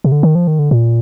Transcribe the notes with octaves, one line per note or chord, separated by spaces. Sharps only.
C3
D3
D#3
F3
D#3
D3
A#2